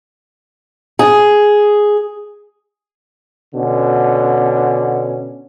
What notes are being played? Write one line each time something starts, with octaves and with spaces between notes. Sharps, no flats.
G#4
B2 D3 C#4